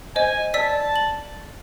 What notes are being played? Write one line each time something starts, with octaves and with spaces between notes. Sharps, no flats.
C5 D#5 G#5
D5 A5 E6 B6
F#7